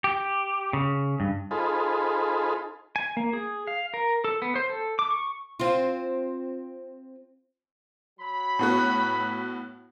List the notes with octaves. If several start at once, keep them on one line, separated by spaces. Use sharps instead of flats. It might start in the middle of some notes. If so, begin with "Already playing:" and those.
G4
C#3
G2
D#4 F4 G#4 A4 C5 B5
G#5
A#3
G#4
F5
A#4
A4
B3
C5
A4
D6
C#6
C4 F4
F#3 B5
A2 B3 F#4